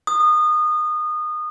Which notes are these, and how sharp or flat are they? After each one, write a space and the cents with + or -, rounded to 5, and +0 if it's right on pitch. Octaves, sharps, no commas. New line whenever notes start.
D#6 -25